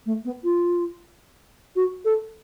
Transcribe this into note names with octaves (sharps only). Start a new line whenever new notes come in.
A3
B3
F4
F#4
A4